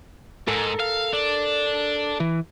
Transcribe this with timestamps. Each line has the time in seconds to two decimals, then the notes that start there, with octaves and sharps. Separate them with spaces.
0.48 G#2 A4 A#4
0.80 F5
1.13 D4
2.20 E3